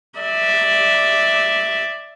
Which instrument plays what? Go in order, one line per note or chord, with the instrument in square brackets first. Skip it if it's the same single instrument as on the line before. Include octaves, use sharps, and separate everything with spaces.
[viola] D5 E5